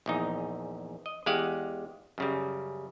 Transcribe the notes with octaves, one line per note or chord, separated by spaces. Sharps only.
A#1 E2 D#4
D#5
E2 G#3 G4 F5 F#5
F#2 C#3 G3